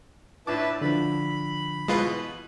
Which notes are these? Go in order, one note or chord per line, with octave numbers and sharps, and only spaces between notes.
A2 D4 E4 B4 A5 D6
D3 F3 B5
B2 E3 G#3 F4 B4